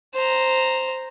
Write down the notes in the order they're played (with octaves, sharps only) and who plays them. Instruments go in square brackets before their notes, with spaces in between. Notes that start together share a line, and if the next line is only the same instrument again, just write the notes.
[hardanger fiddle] C5 A#5